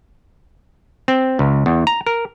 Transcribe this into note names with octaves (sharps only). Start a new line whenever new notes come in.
C4
C#2
E2
A#5
A#4